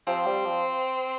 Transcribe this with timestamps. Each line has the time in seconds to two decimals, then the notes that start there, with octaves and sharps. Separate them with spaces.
0.06 F3 C4
0.26 G3
0.45 F3